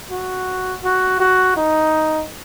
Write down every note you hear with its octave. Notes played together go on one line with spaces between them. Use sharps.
F#4
F#4
F#4
D#4